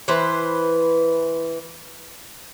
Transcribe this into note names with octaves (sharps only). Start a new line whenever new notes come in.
E3 B4 C5